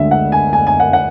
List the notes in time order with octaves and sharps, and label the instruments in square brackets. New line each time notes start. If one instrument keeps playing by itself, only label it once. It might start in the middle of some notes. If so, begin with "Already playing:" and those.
Already playing: [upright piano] D2 D3 G#3 E5
F#5
G#5
G#5
G#5
F#5
F#5